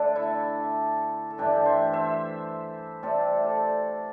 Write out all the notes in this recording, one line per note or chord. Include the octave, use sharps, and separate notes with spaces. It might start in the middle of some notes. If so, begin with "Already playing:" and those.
Already playing: D3 A3 D4 A4 D5
E4
A4
G2 E3 A3 D4 G4
C5 E5
C5 E5
C3 A3 C4 A4 D5
A4 D5